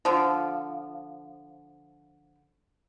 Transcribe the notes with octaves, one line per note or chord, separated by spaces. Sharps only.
D3 F3